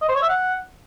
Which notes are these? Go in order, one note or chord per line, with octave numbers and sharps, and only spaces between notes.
D#5
C5
C#5
E5
F#5